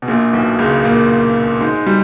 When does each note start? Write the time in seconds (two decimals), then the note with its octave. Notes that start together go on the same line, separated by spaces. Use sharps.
0.02 B2
0.08 A#1 A#2
0.33 B1 B2
0.59 C#2 C#3
0.84 A#2 A#3
1.61 G#2 G#3
1.87 G3